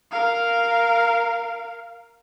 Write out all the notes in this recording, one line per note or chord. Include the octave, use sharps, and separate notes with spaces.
A#4 F5